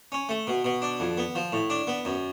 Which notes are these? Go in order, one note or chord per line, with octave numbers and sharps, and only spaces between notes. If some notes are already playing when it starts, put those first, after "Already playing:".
C#4
A3
B2
B2
D4
F2
B3
F3
A2
D4
B3
F#2